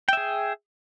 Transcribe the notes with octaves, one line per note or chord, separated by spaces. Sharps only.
G#4 E5 G5